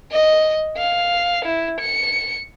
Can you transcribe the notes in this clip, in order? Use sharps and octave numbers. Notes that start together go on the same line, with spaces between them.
D#5
F5
E4
C#7